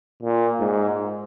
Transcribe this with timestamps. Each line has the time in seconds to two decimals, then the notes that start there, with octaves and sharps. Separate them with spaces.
0.22 A#2
0.60 G#2